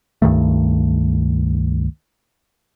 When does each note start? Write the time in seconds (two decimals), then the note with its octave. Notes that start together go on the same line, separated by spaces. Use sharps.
0.22 C#2 G2 D#3 A3